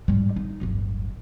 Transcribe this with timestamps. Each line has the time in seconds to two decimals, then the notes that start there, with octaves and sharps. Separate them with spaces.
0.08 G#2 G3
0.36 D#4
0.61 D1 G1